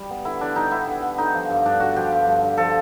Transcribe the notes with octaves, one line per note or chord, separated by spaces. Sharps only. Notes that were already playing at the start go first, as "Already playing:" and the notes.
Already playing: G3
B3
D3 E4
D3 D4
G3 D#4
B3 E4
D3
D3
D3 D#4
F3
G2
G2 D4
D3 F#4
F3 G4
G2
G2
D3
F3 A4